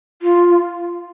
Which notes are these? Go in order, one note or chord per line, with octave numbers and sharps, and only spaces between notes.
F4